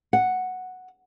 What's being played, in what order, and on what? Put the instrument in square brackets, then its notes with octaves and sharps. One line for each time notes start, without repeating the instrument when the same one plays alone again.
[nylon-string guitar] F#5